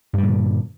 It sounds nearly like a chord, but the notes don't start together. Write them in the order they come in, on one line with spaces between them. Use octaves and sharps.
G2 G3 A#2 D3